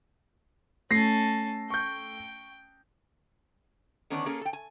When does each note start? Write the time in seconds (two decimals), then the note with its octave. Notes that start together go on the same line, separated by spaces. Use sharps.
0.91 A3 C#4 A5 A#6 C7
1.70 G5 C#6 G6
4.10 D3 D#3 B3 C#4 D4 D5
4.26 A#3 C#4 G#4 A4
4.41 A4 G5
4.53 G#5